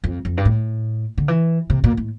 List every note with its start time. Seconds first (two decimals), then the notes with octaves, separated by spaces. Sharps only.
0.04 F2
0.25 F2
0.37 G2
0.45 A2
1.18 D3
1.28 E3
1.70 C3
1.84 A#2
1.97 A2